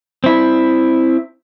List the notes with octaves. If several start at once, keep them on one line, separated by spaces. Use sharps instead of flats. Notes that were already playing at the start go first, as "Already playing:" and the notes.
C4 E4